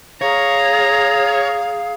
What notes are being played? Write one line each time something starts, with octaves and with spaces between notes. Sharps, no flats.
G#4 C#5 F5 A#5